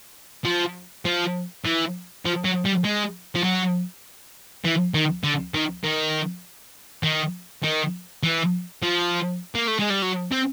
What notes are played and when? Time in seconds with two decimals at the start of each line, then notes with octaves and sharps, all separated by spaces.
0.45 F3
1.05 F3
1.65 E3
2.25 F3
2.44 F#3
2.65 G3
2.84 G#3
3.35 F3
3.44 F#3
4.65 E3
4.94 D#3
5.24 D3
5.54 D#3
5.84 D#3
7.03 D#3
7.63 D#3
8.23 E3
8.82 F3
9.55 A#3
9.68 A3
9.80 G#3
9.90 G3
10.02 F#3
10.32 C4